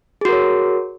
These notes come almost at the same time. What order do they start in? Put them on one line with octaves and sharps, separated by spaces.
G#4 F#4 A#4 C#5